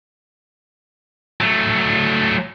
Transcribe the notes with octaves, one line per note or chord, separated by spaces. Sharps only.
F#3 A3